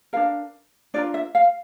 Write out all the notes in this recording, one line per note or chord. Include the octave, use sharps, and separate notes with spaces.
D4 F4 A#4 F5
D4 F4 A#4 D5
E5
F5